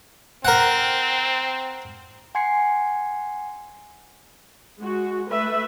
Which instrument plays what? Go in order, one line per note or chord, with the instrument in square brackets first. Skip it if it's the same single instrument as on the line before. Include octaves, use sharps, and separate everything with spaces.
[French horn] C4 [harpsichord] A#4 F#5
[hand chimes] F#5 G#5 C6 G#6 C7 C#7
[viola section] G#3 F#4
A3 B4 E5